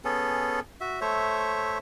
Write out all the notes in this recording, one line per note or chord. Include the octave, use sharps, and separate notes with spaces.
B3 C#4 G#4 A4
F#4 E5
A3 C5 C#5 E5